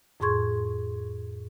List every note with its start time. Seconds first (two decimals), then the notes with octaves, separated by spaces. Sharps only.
0.20 F2 A2 G#4 C6 C#6 G#6